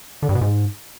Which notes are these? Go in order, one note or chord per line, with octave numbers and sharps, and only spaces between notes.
D3
G2
B2
G#2